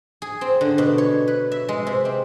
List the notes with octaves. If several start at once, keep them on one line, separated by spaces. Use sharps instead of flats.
G#4
C4
D3
B2
C#5
B4
E5
G#3
C3
C4